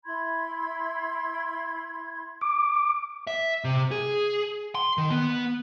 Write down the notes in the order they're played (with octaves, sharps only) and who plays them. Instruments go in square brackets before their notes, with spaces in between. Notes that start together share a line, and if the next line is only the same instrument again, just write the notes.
[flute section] E4 B5 C6 G#6
[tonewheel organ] D6
[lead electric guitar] E5
C3
G#4
C6
D#3
B3